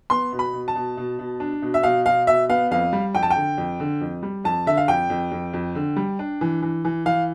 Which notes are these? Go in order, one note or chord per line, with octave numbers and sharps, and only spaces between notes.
B3 C6
B2
B5
B2
A5
B2
B2
B2
D4
B2
E5
B2 F5
B2 F5
B2 E5
B3 F5
F2 F5
G3
F2 G5
A5
G5
D3
F2
D3
F2
G3
F2 A5
D3 E5
F5
F2 G5
F2
F2
F2
D3
G3
D4
E3
E3
E3
E3 F5